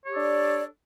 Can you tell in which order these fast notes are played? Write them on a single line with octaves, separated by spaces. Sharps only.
C#5 G4 A4 D4 D5